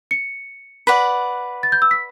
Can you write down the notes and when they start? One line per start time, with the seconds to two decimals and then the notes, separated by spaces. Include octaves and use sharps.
0.11 C#7
0.87 B4 D5 F#5 B6
1.63 A6
1.72 G6
1.82 E6
1.91 B6